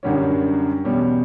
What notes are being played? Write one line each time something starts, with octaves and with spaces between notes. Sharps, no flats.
F#2 D3 G3 C#4
E2 B2 G3 C#4